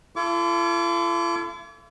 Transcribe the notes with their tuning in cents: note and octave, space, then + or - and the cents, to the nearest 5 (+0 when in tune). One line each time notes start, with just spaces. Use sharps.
F4 -45 A4 +0 D6 -35